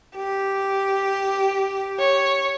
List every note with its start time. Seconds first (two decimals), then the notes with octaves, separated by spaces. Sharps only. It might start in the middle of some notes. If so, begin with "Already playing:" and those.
0.15 G4
1.99 C#5